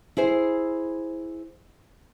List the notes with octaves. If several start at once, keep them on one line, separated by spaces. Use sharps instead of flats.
E4 G#4 C5